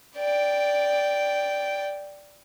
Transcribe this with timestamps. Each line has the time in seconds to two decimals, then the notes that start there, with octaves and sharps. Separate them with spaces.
0.17 D5 G5